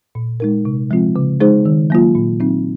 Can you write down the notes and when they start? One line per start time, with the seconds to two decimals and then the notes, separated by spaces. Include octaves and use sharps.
0.15 A#2
0.40 G#3 D#4 A#4
0.65 C3
0.91 F3 G#3 C4 F4
1.16 C#3
1.41 G#3 D#4 G#4 C5
1.65 D#3
1.90 F#3 A#3 F4
2.15 A#2
2.40 F#3 C4 D#4